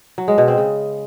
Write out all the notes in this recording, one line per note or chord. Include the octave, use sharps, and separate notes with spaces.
F#3
G#3
B2
C4
C#3